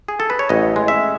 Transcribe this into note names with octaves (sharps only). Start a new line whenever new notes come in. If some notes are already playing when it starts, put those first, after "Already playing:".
G#4
A4
B4
C#5
A1 D#5
G#3
E5